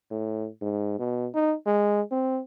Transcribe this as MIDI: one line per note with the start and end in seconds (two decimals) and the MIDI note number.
0.11 0.48 45
0.62 0.94 44
0.99 1.27 47
1.35 1.54 63
1.66 2.01 56
2.12 2.41 60